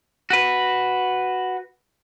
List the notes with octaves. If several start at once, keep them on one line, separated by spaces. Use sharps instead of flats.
F#4 B4